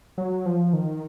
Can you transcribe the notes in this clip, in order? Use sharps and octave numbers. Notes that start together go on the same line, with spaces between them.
F#3
F3
D#3